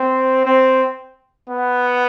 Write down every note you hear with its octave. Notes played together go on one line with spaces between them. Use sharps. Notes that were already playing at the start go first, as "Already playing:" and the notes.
Already playing: C4
C4
B3